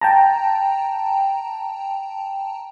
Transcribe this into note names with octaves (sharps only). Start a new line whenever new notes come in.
G5 A5 A#5